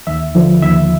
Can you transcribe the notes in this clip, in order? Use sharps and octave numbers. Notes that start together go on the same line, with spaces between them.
D#2 E5
D3 F3
D#2 E5